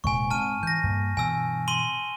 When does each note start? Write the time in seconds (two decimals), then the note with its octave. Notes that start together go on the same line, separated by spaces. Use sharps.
0.04 D#1 G#2 C3 G#5 C#6
0.30 G#2 C4 A5 F6 D#7
0.63 E3 G6 A#6
0.83 G2 A#3
1.17 G2 B2 E3 G#5 E6
1.68 C6 D#7 G7